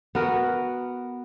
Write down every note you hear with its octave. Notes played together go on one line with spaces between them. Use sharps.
B3 F#4 A#4